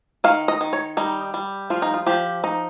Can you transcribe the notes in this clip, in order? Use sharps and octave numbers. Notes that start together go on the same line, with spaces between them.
D#3 F5
D#5
D#3
C#5
G3 D#4
G3
F3 F4
D#4
F4
F3 G4
D#4